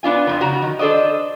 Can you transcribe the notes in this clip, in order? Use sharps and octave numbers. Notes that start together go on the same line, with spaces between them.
B3 D4 F4 G#5
F2 A#2 F3
C#3 F#4 A#5
D#3
D4 A4 C5 D5 D#5